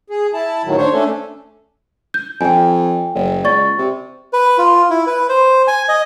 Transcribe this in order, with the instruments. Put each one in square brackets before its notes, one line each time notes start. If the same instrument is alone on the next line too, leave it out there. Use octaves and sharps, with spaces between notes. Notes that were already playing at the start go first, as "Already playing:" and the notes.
[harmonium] G#4
E4 A5
D#2 A2 D#3 F#3
D4 C5 C#5
A3 C#4 D4 A4
[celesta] G6
[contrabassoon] F2 [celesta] G5 G#5
[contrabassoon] F#1
[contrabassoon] C#2 [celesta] D5 C#6 A6
[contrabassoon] C3
[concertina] B4
F4
E4
B4
C5
G#5
D#5